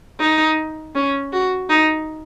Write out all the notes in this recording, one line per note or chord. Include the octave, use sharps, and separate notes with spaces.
D#4
C#4
F#4
D#4